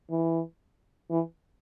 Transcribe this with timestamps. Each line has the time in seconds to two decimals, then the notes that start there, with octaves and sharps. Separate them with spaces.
0.10 E3
1.11 E3